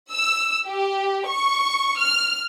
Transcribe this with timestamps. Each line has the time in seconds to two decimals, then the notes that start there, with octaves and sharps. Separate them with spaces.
0.11 E6
0.68 G4
1.28 C#6
1.99 F6